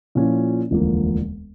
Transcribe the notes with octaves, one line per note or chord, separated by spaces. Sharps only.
A#2 F3 C#4 E4
E1 D2 D3 F3 A#3